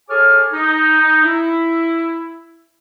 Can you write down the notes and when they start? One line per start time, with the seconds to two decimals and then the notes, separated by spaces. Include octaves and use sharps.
0.09 G#4 A4 C#5 G#5 D6 F6
0.53 D#4
1.24 E4